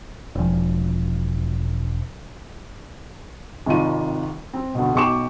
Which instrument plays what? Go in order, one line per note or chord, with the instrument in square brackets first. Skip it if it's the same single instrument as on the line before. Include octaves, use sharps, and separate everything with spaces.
[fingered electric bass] E1 F3
[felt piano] G#1 C3 D#3 F4 D#7
C4
D2 B2
B1 B2 G5 C#6 D6 E7